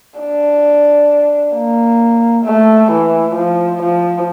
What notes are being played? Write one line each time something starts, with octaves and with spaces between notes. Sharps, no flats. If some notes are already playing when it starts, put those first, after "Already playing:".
D4
A#3
A3
E3
F3
F3